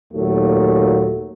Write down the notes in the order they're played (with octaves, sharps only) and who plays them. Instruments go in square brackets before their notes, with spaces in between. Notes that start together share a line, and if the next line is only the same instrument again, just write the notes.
[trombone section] D#2 A#2 F#3 A3